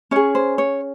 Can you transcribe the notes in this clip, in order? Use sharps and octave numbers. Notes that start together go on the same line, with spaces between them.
C#4 G#4 C#5
C5
C#5